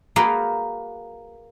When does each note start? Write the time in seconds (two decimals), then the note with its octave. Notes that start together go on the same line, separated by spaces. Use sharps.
0.16 A#3 F#4 G#4 B4 F5 G5